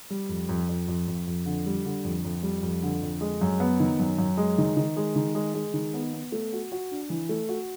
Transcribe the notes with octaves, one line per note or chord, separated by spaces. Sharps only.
G3
F2
F2
F2
F2
F2
F2
D3
G3
D3
F2
F2
G3
F2
D3
F2
G#3
F#2
B3
D#3
F#2
F#2
G#3
D#3
D#3
G#3
D#3
G#3
G#3
D#3
B3
B3
A3
F#4
F#4
D4
E3
A3
F#4